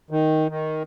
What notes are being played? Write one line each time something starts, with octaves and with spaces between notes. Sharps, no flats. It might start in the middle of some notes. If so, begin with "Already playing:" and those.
D#3
D#3